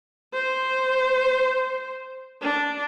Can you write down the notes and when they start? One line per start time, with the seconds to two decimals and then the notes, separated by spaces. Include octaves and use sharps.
0.33 C5
2.42 D4